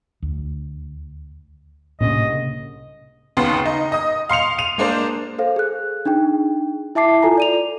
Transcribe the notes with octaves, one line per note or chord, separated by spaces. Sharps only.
D2
C2 A2 C#3 A#3 D4 D#5
D#2 C#3 B3 C6 C7
D#4
D#5 D#6
F5 C6 C#7 F7
D#7 F7
G#3 A#3 D4 C5
A4 C5 F5
G#4 F#6
D4 D#4 G#4 G5
E4 E5 A5 D6 C7
F4 A4 G#5 A#5
D5 D#7 F7